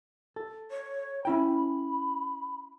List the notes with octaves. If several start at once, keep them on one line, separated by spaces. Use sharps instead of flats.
A4
C#5
C#4 E4 G5 B5